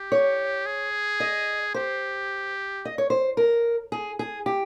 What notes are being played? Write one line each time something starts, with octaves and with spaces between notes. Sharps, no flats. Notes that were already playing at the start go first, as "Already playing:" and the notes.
Already playing: G4
C#5
G#4
D#5
G4 C5
D#5
C#5
C5
A#4
G#4
G#4
G4